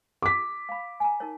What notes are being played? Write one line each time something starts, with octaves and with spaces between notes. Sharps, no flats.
D6 B6
F5 B5
G#5 A#5
D#4 A#4 C#5